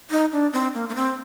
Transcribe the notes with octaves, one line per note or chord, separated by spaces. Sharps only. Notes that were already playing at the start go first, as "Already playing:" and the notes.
D#4
D4
C4
A#3
A#3
C4